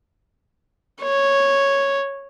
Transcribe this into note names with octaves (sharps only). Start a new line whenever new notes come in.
C#5